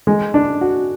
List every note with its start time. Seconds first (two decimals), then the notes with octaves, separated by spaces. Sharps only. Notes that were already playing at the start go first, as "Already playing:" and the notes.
0.07 G#3
0.34 D4
0.61 F#4